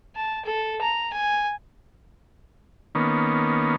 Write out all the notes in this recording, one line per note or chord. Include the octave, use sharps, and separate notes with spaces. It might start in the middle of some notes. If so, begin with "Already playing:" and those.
A5
A4
A#5
G#5
D#3 A#3 B3 C#4